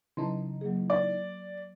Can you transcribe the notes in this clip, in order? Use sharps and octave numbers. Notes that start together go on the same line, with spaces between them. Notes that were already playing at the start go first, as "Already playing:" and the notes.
C#3 E3 F#3 D#4 A5 C6
F#3 A#3 G#4
D5